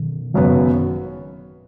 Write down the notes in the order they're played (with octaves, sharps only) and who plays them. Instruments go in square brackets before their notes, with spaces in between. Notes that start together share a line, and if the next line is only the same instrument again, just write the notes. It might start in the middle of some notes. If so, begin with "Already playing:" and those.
Already playing: [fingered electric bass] B2 D#3
[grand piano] G#1 F#2 C#3 F#3 B3